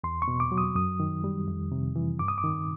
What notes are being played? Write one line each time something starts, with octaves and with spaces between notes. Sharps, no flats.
E2 C6
C#6
B2
D6
F#3
D#6
F#2 D#6
D#3
G3
F2
C3
E3
G2 D6
D#6
D6
D#3